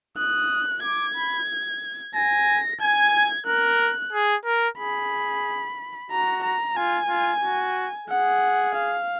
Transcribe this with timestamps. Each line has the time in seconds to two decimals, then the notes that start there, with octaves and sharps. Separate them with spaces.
0.17 D#6 F#6
0.83 D6 G#6
1.17 B5
2.15 G#5 A#6
2.81 G#5 G#6
3.46 A#4 F#6
4.13 G#4
4.46 A#4
4.78 G#4 B5
6.11 F#4 A#5
6.44 A#5
6.77 F4 G#5
7.09 F4
7.43 F#4
8.08 G#4 F#5
8.75 F5